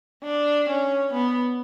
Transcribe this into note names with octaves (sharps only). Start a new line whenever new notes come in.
D4
C#4
B3